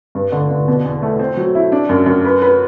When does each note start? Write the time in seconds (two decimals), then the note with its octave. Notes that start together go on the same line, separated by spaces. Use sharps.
0.15 G2
0.32 D3
0.51 D3
0.68 B2
0.85 E2
1.02 A3
1.19 C4
1.37 F#3
1.55 E4
1.72 D4
1.89 F#2
2.06 F#2
2.25 B4
2.42 B4